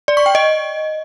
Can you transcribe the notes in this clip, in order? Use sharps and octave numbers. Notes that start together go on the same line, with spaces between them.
D5
C#6
G5
D#5